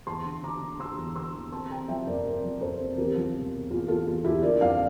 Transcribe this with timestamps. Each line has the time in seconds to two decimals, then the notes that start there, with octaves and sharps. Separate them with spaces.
0.07 E2 A5 C6
0.25 D3
0.44 D3 A#5 D6
0.62 D3
0.80 D3 C6 E6
0.98 E2
1.15 D3 C6 E6
1.34 E2
1.52 C4 A5 C6
1.71 C3 G5 A#5
1.88 F3 E5 G5
2.07 F2 A#4 D5
2.25 F2 A#4 D5
2.43 F3
2.61 F2 A4 C5
2.80 C3
2.98 E2 G4 A#4
3.15 F3
3.35 E1
3.53 E1
3.70 E2 F4
3.88 E2 F4 A4
4.07 E2 F4
4.24 E2 E4 G4
4.43 D3 A#4 D5
4.61 F2 D5 F5